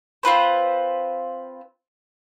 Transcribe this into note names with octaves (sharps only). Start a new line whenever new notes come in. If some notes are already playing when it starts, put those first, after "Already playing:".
C4 F4 B4 C5